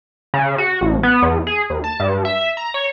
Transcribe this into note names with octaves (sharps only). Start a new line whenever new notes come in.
C#3
F#4
A1
B3
E2
G#4
D#2
A5
G2
E5
A#5
C#5